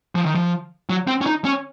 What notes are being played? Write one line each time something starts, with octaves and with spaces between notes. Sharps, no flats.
F3
D#3
F3
F#3
C4
C#4
D#4
C#4